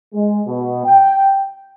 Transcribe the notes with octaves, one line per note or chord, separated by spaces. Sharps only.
G#3
B2
G5